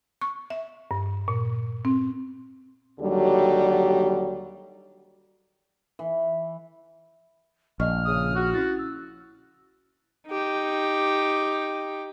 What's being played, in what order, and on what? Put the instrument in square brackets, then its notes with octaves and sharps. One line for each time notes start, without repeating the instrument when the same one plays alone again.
[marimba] C#6
E5
G2
A#2
C4
[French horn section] D#2 D3 F#3 G3
[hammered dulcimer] E3
[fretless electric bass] A#1 [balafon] D5 D#5 C#6 [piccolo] F6
[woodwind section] C#3 D#6
F#4
[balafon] C#4 E4 [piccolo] A6
[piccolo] E6
[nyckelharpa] D#4 G4